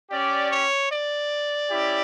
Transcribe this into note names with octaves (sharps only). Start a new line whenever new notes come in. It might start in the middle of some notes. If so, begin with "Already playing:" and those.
C#4 G4 D5
C#5
D5
C#4 E4 G4